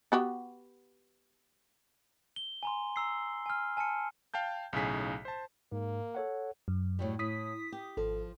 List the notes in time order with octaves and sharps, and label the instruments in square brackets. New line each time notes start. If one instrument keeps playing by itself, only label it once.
[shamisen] B3 F#4 G4
[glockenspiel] G7
G#5 A#5 C6
A#5 E6 C7
G#5 F6
G#5 A5 F6 C#7
[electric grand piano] F5 G5 A5 G6
B1 A2 C#3 D#4 G#4 B6
C5 A5
[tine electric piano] G#2 [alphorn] A#3
[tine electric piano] A4 C#5 F#5
[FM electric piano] F#2
[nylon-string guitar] A2 F#3 G3
[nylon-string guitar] A2 [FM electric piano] D#6 B6
[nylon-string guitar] G4
[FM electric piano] G#1 A4 [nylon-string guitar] F3